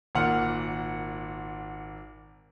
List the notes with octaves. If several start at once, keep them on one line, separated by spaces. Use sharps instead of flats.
G#1 A#2 F#5 F6